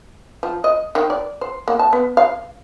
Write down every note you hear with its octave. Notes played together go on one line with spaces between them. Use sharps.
F3
D#5
D#3
D5
C5
A#3
A5
B3
F5